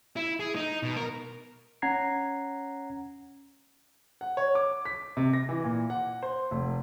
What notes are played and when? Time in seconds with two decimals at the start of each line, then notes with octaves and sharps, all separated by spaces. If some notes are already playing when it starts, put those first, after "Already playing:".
0.16 E4
0.40 G#4
0.56 D#4
0.83 B2
0.96 A#4
1.82 C#4 F#5 A#5 G#6 C7
4.21 F#5
4.37 C#5
4.55 D6
4.85 B6
5.17 C3
5.33 A#6
5.49 E3
5.64 A#2
5.90 F#5
6.23 C5
6.51 F1